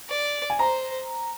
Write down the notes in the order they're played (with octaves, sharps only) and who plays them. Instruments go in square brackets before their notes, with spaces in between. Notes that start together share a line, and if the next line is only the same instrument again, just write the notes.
[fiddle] D5
[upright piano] G#5
[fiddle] C5 [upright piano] A#5